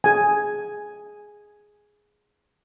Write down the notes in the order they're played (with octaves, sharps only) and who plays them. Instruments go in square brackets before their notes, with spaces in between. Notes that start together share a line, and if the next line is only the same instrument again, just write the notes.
[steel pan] G#4 G#5